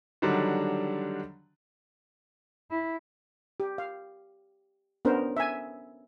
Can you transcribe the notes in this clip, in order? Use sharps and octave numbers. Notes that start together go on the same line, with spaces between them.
D3 D#3 F#3 G3 D4
E4
G4
F5
B3 C#4 D4 A#4 C5
E5 G#5